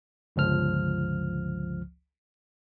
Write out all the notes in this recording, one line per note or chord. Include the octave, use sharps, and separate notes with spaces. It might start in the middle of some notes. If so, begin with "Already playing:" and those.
G1 C#2 F3 F6